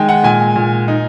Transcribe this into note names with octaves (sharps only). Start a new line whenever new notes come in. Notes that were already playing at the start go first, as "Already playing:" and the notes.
Already playing: D#3 G#3 G5 G#5
F#5
A#2 G#5
A#2
D#4